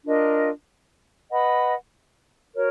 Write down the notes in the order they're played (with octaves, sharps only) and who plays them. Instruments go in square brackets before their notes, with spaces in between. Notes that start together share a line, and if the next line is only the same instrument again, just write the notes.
[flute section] D4 F4 A#4 D#5
B4 D#5 F#5 B5
F#4 A#4 C#5